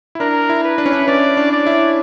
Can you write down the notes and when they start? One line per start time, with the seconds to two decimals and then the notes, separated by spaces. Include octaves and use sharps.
0.15 E4
0.20 D4 A#4
0.49 E4
0.64 B4
0.78 D4
0.86 C#4
0.93 D4
1.08 C#4 D5
1.37 D4
1.51 D5
1.67 E4